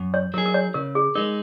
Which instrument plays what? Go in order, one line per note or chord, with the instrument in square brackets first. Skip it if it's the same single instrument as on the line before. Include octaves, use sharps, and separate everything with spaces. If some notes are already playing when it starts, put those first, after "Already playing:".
Already playing: [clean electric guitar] F#2
[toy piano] C#5
[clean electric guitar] F#3 D#4 G#4 [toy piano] A#4
[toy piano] A#4
C#5
[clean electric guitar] C#3 [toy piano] A#4
[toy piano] G#4
[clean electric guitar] G#3 D#4 [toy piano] A#4